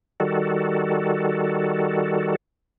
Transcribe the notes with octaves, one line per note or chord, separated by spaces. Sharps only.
D#3 G3 F#4 A4